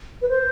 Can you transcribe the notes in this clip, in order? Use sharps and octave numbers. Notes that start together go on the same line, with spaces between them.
B4
C5